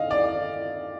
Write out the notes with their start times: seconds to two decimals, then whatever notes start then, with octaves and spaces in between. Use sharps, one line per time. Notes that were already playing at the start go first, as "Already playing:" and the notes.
Already playing: D#5 F5
0.11 D5